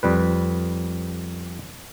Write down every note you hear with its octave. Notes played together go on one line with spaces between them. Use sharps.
F2 G3 B4